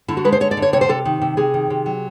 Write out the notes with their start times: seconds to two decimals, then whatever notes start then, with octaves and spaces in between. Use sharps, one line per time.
0.08 D3 E4
0.17 F#4
0.25 G#3 B4
0.32 C5
0.40 D3 C#5
0.51 D5
0.57 D3
0.62 C#5
0.73 C3 C#5
0.81 C5
0.89 C3 A4
1.05 D#3
1.21 C3
1.37 C3 G#4
1.54 D#3
1.70 C3
1.86 F#3